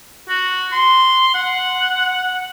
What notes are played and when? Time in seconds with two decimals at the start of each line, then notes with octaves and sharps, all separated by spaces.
0.28 F#4
0.72 C6
1.34 F#5